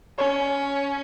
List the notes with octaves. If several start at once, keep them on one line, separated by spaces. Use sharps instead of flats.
C#4 C#5